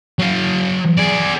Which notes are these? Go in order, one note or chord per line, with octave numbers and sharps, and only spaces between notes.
F#3 F5
G#4 D5